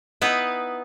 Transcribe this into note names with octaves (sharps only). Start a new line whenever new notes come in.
B3 D#4 E4 B4